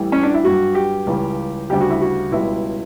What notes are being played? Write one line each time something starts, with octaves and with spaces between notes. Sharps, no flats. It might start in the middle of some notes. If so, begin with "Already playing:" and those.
Already playing: A1 A2 E3 G3
C#4
D4
E4
G2 F#3 F#4
G4
C#2 C#3 E3 G3
D2 C#3 G3 G4
F#4
E4
F#4
C#2 B2 G3 E4